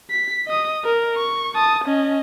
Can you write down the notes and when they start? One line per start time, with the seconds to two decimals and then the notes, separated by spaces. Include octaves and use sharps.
0.10 B6
0.47 D#5 D#6
0.84 A#4
1.17 C#6
1.55 A5 D#6
1.84 C#4 D#5